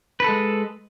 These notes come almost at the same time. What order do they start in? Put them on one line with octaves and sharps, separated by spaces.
B4 A4 G#3